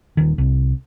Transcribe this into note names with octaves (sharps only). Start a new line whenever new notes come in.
D#1 D#3
C2